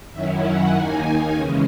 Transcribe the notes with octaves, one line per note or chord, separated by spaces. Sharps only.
F#2 D#3 F#3 C#4 E4 E5
F#5
D#2 D#3 A#3 D#4 G#5
C#3 E3 G#3 C#4